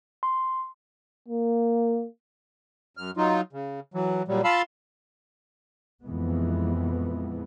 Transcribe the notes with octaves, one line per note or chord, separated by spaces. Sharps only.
C6
A#3
F#2 F6
F#3 D#4 F4
C#3
E3 F#3
A#2 F#3 G3
F4 F5 A5 B5 C6 E6
F2 A#2 E3 G#3 B3